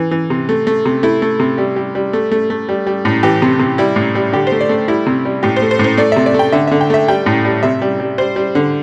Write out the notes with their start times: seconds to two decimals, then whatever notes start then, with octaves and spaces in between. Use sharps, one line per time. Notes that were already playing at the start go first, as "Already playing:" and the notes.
Already playing: E3
0.11 E3
0.30 C3
0.49 A3
0.67 A3
0.86 C3
1.03 A3 E4
1.22 A3
1.40 C3
1.58 G3
1.76 G3
1.95 G3
2.13 A3
2.32 A3
2.50 A3
2.69 G3
2.86 G3
3.05 A2
3.23 E3 G4
3.42 C3
3.59 C3
3.78 G3 E4
3.96 A2
4.15 G3
4.33 D3 G4
4.47 C5
4.52 A3
4.61 D5
4.69 A3
4.88 G3 E4
5.06 C3
5.25 G3
5.43 A2 G4
5.56 C5
5.62 A3
5.71 C5
5.79 A2
5.84 C5
5.98 A3 D5
6.12 C3 E5
6.26 D5
6.34 A3
6.39 G5
6.52 D3 E5
6.67 D3 E5
6.81 G5
6.90 A3 E5
7.08 G3 G5
7.26 A2
7.45 G3
7.63 C3 E5
7.82 G3
8.00 G3
8.18 G3 C5
8.36 G3
8.55 D3